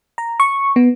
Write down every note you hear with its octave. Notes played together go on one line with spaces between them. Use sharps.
A#5
C#6
B3